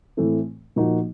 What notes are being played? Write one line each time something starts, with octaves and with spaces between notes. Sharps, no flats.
A2 E3 A3 C4
A#2 F3 A#3 D#4 F#4